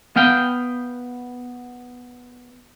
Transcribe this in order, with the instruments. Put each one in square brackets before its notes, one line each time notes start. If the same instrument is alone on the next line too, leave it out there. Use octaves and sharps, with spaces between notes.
[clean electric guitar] B3 F5 G5